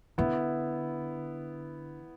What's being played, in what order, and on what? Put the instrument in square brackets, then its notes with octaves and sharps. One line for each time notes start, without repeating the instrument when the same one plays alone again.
[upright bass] D3 [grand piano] B3 E4